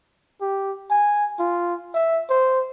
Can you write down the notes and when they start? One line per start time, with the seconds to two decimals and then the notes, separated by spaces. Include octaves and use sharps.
0.41 G4
0.90 G#5
1.39 F4
1.94 E5
2.30 C5